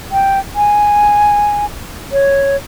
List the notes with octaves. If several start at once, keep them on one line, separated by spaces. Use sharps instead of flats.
G5
G#5
C#5